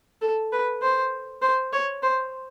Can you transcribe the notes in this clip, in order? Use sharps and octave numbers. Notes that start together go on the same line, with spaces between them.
A4
B4
C5
C5
C#5
C5